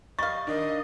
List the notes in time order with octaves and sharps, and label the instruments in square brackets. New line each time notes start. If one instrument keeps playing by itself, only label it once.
[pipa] G3 F5 [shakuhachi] D#5 [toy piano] C#6 [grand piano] A6
[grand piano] D#3 D4 [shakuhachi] D#5